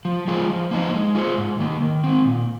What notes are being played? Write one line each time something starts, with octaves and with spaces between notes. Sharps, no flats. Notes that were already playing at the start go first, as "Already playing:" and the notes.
F3
G#3 F4 G#4 C5
F3
A#3 D#4 C5 D#5
G#3
F4 G#4 C5
G#2
D#3 A#3
D#3
G#3 C4
A#2